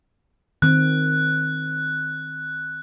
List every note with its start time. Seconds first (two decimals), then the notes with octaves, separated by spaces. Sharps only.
0.62 D#3 C4 F#6